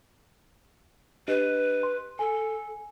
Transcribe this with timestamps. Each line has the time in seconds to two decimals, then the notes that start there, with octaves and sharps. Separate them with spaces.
1.28 D4 G4 B4 D#5
1.83 C6
2.19 A4 G#5